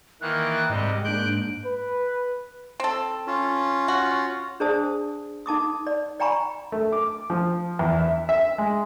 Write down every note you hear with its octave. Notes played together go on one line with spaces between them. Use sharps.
D#3 E3 A#3 F#6
G#2 C3 G3 D#5
G#3 A#3 D4 F#6 G6 D7
B4
C4 A4
C#4 F4
F#4
D4 G#4 C5 D5 A5 D#6
D#4 A5 D6 D#6
D5
D5 G5 G#5 A#5 B5 C#6
A3
D6
F3
E2
E5
E5
G#3